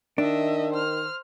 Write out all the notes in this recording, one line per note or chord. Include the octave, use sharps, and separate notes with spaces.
D#3 D4 D#5 E5
C5 F6